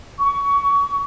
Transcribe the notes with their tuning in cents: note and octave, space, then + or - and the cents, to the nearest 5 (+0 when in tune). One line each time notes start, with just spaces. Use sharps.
C#6 +25